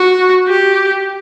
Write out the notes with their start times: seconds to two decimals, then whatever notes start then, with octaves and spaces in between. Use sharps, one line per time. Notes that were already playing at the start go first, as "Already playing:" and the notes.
Already playing: F#4
0.48 G4